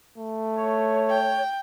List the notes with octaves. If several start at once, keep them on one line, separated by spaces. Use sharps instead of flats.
A3
C#5
G5